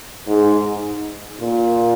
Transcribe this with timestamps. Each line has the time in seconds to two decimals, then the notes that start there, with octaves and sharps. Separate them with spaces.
0.27 G#2
1.40 A#2